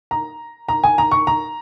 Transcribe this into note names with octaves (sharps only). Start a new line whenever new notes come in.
A#5
A#5
G#5
A#5
C#6
A#5